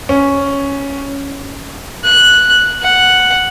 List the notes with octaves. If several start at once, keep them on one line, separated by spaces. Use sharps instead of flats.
C#4
F#6
F#5